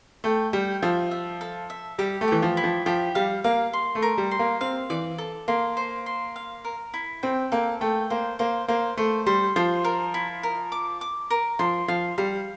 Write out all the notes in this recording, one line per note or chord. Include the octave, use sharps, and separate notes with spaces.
A3 G5
G3 G5
F3 E5
E5
A4
E5
G3 G4
A3
E3 G4
F3
E4
F3
F3 G4
G3 F5
A#3 F5
C6
A3
A#4
G3
C6
A#3
C4 F5
E3 D5
A4
A#3 C6
C5
C6
F5
A#4
E4
C4 G5
A#3 A4
A3 G5
A#3 C5
A#3 C5
A#3 C5
A3 C5
G3 C6
F3 C5
A#4
E4
A#4
D6
D6
A#4
F3 C6
F3 F5
G3 F5